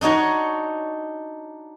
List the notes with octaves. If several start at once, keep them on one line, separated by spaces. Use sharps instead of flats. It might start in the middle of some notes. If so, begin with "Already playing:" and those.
D4 D#4 F#4 C#5